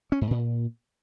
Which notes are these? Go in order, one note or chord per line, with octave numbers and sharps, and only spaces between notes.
C#4
G#2
A#2